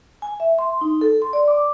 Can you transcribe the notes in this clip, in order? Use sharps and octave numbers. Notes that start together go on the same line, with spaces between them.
G#5
E5
C6
D#4
A4
C6
D5
D6